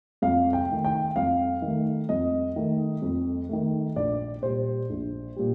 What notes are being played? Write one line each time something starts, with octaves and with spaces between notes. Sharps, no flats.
F2 F5
G5
D#3 A3
G5
F2 F5
D#3 A3
F2 D#5
D#3 A3
F2
D#3 A3
A#1 D5
A#2 G3 C5
A#1
A#2 G3